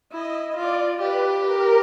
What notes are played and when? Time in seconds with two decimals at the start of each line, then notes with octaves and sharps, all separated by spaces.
0.12 E4 D#5
0.57 F4 D5
1.01 G4 B4
1.45 A#4